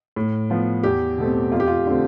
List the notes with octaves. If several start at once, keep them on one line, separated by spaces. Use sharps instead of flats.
A2
F3 B3
E2 G4
B2 A3 C4
F2 F4
G4
F4
D3 A3 C4